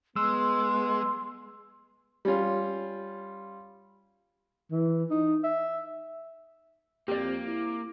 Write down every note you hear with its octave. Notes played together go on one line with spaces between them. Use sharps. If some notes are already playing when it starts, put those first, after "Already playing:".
G#3 B3 C6 E6
G3 C#4 F4
E3
D#4
E5
F2 A#3 C4 F4 G4 D5 D6
E4